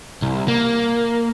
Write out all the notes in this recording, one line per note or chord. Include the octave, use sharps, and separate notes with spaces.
C2
A#3